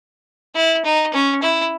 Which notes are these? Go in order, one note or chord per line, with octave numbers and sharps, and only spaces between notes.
E4
D#4
C#4
E4